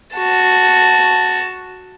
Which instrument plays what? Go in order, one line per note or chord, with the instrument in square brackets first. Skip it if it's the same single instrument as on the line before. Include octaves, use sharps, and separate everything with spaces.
[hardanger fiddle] F#4 A5